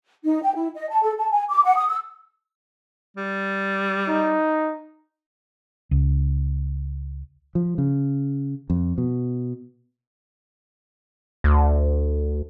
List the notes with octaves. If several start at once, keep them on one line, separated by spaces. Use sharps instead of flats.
D#4
G5
E4
D#5
A5
A4
A5
G#5
D6
F#5
D#6
E6
G3
D#4
C#2
F3
C#3
F2
B2
D2